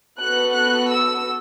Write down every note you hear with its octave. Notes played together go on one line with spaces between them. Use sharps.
B3 F#4 A4 F#6
F#6
E6